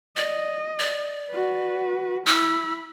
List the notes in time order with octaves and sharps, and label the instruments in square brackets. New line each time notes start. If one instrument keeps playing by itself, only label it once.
[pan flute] D5 [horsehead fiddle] D#5
[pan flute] D5
[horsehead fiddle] F#4 B4
[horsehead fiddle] E4 B5 [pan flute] E6